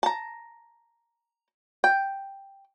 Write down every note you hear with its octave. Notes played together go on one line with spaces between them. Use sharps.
A5 A#5
G5